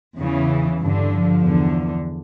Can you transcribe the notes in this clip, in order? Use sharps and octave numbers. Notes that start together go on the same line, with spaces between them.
E2 C#3 E3
G2 D3
F3
E2 D3